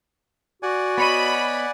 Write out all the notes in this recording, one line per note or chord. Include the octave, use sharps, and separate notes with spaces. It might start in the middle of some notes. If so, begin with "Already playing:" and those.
F#4 D5 F#5 G#5
B3 C#5 D#5 B5